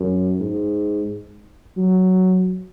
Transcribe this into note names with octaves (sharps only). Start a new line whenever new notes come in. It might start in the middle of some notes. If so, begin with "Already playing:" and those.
Already playing: F#2
G#2
F#3